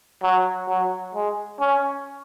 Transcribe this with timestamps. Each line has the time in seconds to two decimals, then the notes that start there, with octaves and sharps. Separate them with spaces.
0.23 F#3
0.68 F#3
1.15 G#3
1.60 C#4